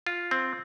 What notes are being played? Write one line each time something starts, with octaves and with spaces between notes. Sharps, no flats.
F4
C4